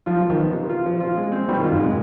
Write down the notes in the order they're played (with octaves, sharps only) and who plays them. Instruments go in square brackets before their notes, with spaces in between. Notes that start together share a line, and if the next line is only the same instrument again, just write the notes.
[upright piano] F3 [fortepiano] F4
[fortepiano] F3
[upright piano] D#3
[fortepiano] B3
C3
F4
F3
F4
G#3
C4
[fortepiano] B2 [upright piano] G3
[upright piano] D#3
[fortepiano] F4
[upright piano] G#2
[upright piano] C3 [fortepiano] G#3